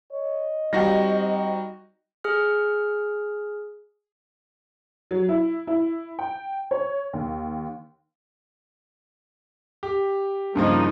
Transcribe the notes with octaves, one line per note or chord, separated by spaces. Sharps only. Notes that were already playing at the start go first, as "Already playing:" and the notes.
C#5 D#5
G3 C4 D#4 F#4 G5 A#6
G#4 F6
F#3
E4
E4
G5
C#5
D#2
G4
G2 C#3 F3 A#3 D#4